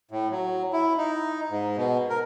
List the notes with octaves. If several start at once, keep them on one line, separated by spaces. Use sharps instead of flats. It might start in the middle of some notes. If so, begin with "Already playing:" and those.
A2
F#3
E4
D#4
G#2
B2
A#4